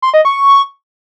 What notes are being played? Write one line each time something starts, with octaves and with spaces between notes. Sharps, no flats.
C6
D#5
C#6